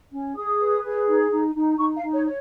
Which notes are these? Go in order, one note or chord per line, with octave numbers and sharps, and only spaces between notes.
C#4
G#4 D#6
B4
G#4
D#4
D#4
D#4
D#4 C#6
F5
D#4
C#5
C#5